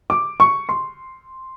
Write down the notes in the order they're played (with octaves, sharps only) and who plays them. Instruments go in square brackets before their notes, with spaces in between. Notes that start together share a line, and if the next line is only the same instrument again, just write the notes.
[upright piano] D6
C#6
C6